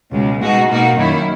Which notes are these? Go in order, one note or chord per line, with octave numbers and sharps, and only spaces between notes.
C#2 B2 G#3
B2 G#3 D#4 F#4
B2 A#3 D#4 F#4
F#2 D#3 A#3 E4